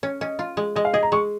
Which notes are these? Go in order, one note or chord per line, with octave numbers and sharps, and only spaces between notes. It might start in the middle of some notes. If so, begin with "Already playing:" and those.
C#4 C#5
C#4 D#5
F4
G#3
G#3 D#5
F5
G#4 D#5
A#5
G#3 C#6